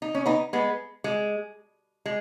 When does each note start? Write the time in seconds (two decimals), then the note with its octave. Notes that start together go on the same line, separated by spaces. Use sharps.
0.02 D#4
0.15 C#4
0.26 B3 D#4
0.53 G#3 B3
1.04 G#3
2.06 G#3